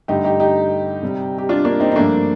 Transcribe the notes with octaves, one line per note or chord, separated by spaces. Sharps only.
G2 D3 A3 D#4 G4
D#4 G4
D#4 G4
C3 G3
G4
D4 F4
A#3 D4
C4 D#4
D#4
G2 F3 A3 A#3 D4